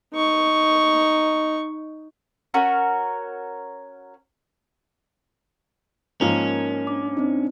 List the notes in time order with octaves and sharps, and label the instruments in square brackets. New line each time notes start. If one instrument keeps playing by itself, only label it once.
[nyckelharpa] D#4 C#6
[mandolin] C#4 F#4 A#4
[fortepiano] G#2 F3 A#3 [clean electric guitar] C#4 [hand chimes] A#4
[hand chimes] D4 D6
C4 D4 D#4